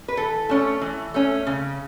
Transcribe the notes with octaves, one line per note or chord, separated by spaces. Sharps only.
B4
E3 A4
A3 C#4
E3
A3 C#4
C#3